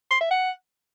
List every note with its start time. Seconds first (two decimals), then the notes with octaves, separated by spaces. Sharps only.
0.11 C6
0.21 E5
0.31 F#5